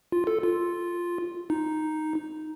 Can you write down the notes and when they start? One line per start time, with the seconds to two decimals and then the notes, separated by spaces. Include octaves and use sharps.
0.12 F4
0.27 A4
0.43 F4
1.50 D#4